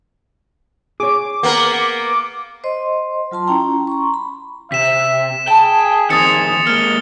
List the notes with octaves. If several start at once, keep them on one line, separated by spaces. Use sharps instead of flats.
G#4 C#5 D6
A#3 B3 A#4
C5 D#5 C6
F#3 F4 A5 C6
C#4 E4 G5 A#5
A#5 C6 C#6
B5
C3 E5 B6 E7
G#4 G5 A5
F2 D#3 C4 D#6 A6 C#7
G#3 A#3 G#5 F6 G7